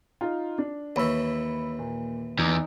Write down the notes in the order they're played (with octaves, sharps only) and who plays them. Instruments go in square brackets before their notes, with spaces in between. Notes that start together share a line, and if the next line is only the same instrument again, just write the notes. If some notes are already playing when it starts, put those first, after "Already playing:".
[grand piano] D#4 F4
D4
[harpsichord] D#2 E3 [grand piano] C#5 B5 E6
[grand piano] A#2
[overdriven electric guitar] E2 [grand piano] D#4